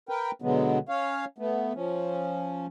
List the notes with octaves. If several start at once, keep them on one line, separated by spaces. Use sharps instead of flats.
A#4 B4 G5
B2 D3 F#3 G#3 B3
C#4 C#5 F5
A3 B3
F3 C#4